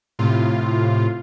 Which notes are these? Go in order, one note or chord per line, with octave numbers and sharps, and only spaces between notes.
A2 C3 F4